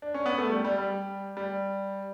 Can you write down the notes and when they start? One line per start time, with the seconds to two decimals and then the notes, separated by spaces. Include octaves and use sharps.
0.02 D4
0.14 C#4
0.26 B3
0.38 A3
0.50 G3
0.65 G3
0.78 G3
1.37 G3